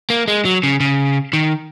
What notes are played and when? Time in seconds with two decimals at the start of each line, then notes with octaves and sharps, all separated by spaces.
0.10 A#3
0.28 G#3
0.45 F#3
0.63 C#3
0.80 C#3
1.33 D#3